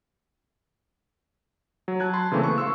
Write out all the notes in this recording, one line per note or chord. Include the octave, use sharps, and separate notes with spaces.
F#3
A5 F#6 G#6
A5 B5 C6
C#3 E3 A3 A#3 C4
C#6
F5 C6 C#6 E6